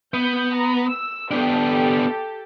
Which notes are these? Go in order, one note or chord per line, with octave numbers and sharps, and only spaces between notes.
B3 G6
A#5
E6
B3 D4 G4 A4